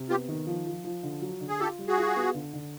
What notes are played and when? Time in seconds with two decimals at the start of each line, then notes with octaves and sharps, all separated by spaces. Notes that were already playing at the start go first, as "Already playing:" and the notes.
Already playing: C3
0.09 B3 F4 G4
0.28 D#3
0.47 F3
0.66 F3
0.84 F3
1.03 D3
1.22 F#3
1.40 D3
1.49 G#4
1.60 F4 G4 A4
1.79 G3
1.88 F#4 G#4
1.97 F4
2.16 B3
2.34 D3
2.53 D3